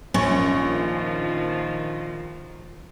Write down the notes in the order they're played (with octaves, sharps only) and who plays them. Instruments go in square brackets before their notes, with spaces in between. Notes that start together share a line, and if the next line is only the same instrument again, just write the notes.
[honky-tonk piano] A#1 [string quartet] D#3 F3 [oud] C#4